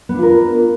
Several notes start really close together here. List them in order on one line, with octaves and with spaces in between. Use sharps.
B3 D4 F4 A#4